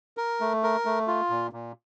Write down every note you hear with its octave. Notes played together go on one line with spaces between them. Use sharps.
A#4
A3
A#4
A3
F4
A#2
A#2